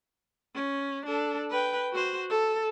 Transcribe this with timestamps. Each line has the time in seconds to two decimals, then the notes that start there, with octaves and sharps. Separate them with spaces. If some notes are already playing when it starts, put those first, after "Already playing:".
0.55 C#4
1.06 D4 A4
1.50 B4 G5
1.93 F#4 C5
2.30 A4